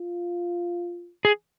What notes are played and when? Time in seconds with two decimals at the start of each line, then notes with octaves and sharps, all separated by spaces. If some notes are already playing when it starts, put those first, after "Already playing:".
Already playing: F4
1.25 G#4